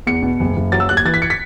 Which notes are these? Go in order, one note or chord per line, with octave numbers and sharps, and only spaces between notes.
E2 C#7
B2
F#1
F#1
F#3 A6
E6
D#2 F#6
G#6
E3 A6
B6
C#7
B6